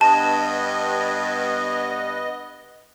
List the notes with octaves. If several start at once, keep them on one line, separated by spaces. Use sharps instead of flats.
G2 B3 D#5 A5